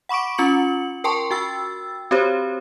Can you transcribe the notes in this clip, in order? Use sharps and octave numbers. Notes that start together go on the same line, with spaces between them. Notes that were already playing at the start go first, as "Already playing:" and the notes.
F#5 B5 C#6 D6 D7
C#4 F4 C#7 F#7
A#4 G5 A5 C6 C#6
F#4 G5 E6 A6
C4 F#4 G4 C5 C#5